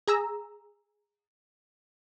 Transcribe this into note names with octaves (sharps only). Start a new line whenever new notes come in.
G#4 A#5 E6